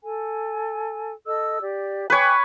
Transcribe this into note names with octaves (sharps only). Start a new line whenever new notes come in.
A4 G#5
A4 D#5 E6
G4 D5
B4 C#5 G5 G#5 D6